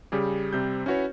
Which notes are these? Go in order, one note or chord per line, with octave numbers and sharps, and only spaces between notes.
C#3 G3 G4 G#4
C3 G3 C4 G6
C#4 E4 F#4 B4 C#5